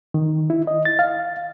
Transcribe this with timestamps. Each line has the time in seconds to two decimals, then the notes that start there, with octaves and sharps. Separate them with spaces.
0.14 D#3
0.50 E4
0.67 D#5
0.85 A6
0.99 F5